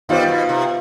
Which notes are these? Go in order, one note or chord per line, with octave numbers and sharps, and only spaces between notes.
D#3 G3 B3 F4 C5
B2
C3